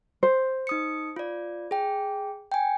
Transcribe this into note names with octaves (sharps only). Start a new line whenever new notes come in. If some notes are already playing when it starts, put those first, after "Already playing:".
C5
D#4 D#6 C#7
F4 D5
G#4 G5
G5 G#5